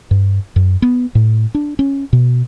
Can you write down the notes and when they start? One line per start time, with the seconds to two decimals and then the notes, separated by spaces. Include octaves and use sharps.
0.11 G2
0.56 F#2
0.82 B3
1.15 A2
1.55 D4
1.79 C#4
2.13 B2